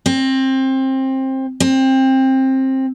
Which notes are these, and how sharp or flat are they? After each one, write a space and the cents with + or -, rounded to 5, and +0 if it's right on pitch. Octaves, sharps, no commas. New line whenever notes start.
C4 +20
C4 +20